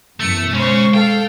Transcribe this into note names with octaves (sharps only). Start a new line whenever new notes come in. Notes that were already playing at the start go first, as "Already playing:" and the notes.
F#2 B2 E3 A3 C#7
C#3 G#3 C#4 C5 C#6
A4 F5 G5